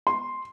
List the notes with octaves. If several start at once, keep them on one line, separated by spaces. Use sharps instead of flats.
C6